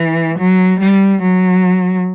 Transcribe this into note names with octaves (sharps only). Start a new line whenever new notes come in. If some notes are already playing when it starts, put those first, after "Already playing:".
Already playing: E3
F#3
G3
F#3